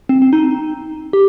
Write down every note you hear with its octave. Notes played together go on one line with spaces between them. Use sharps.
C4
C4
D#4
G4